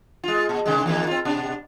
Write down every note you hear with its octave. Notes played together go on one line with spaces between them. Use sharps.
G#3 F4
A#2
C3 D#3 G#3
E2 D#3 A#3
C4 F4
B2 D4